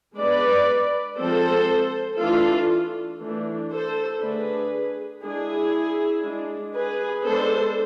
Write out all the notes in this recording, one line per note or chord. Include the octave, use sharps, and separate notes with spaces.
G#3 B3 D4 B4 D5
F3 G#3 C4 A4 C5
E3 A3 D4 F4 A4
E3 A3 D4
A4 C5
D3 A3 D4 G#4 B4
G#3 D4 E4 G#4
G#3 D4
G#4 B4
G#3 B3 D4 A4 C5